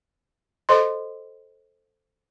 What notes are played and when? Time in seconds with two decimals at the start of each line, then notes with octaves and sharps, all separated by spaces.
0.69 A4 C5 D#5 C6